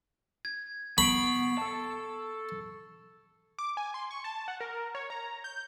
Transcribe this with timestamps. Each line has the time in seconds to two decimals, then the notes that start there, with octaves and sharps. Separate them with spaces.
0.45 G#6
0.98 B3 B5 C#6 C7 D7
1.58 A4 A5
3.59 D6
3.77 G#5
3.94 C6
4.11 C#6
4.24 A5
4.48 F#5
4.60 A#4
4.95 C#5
5.10 A#5
5.44 G6